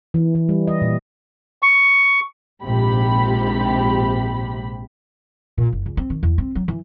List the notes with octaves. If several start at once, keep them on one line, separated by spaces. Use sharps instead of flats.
E3
E3
G3
D#5
A#2
C#6
A#1 G#2 C3 G4 B5
A#2
F#1
C#2
C4
D#3
E2
C4
F#3
E3